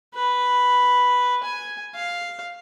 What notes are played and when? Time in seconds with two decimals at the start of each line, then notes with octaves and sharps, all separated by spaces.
0.14 B4
1.43 G#5
1.95 F5